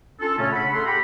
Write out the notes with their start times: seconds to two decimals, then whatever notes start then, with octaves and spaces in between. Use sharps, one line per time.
0.21 C#4 D4 F4 A4
0.38 A#2 C#3 A3 C#4
0.52 F#5 B5
0.73 G#4 A4 F#5 C6
0.86 G4 F#5 G5 A#5 B5